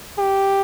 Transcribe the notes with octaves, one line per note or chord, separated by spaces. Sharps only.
G4